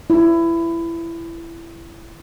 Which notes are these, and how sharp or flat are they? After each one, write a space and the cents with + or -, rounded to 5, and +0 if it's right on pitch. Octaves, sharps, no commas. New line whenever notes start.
E4 +20